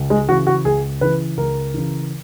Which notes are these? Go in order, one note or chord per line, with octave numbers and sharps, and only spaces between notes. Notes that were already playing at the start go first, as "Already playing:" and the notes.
Already playing: C#2
G#3
C#3 E3 F#4
F#4
C#2 G#4
C#3 E3 B4
C#2 A#4
C#3 E3